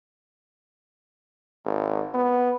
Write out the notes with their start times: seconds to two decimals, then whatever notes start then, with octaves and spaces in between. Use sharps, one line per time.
1.65 G#1
2.14 B3